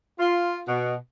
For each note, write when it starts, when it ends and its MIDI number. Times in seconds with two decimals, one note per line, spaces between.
0.19 0.62 65
0.68 0.95 47